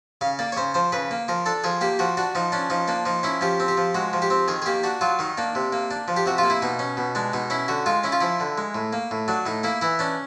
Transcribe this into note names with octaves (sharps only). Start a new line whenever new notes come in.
C#3 F5
A#3 D5
C#5
C#3 C5
F3 C5
C#3 B4
A#3
F3 A#4
D4 A4
F3 G#4
A#3 G4
F3 F#4
D4 F#4
F3 D#4
C#4 D4
F3 D#4
A#3 D4
F3 D#4
C#4 E4
F3 G4
C4
G4
F3
G#3 F#4
F3
G4
C4
D#3 G#4
G#4
A#3 G4
D4 F#4
F#3 F4
D#3 D#4
A#3 D4
C3
A#3
D4
F3
G4
C3 F#4
F4
A#3
E4
B2 D#4
C#4
B2
G#3 D4
B2 D#4
C#4 E4
D3 F#4
G#3 F4
C#4 E4
F4
F3 E4
D3
G#3
A2
A#3
A2
F#3 D4
A2 D#4
A#3 E4
E3 E4
C#4 D4